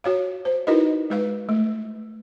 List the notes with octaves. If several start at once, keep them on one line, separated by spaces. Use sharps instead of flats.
F#4 C#5 F5
C5
D#4 E4 F#4 A#4 B4 D#5
G#3 B4 F5
A3